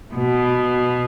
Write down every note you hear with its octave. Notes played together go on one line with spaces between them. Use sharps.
B2